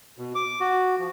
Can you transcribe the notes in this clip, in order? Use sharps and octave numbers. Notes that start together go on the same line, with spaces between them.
B2
D6
F#4
F3